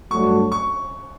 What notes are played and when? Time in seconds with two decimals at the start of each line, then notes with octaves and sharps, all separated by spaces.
0.11 G2 F#3 A3 D4 F#4 C#6
0.52 C#6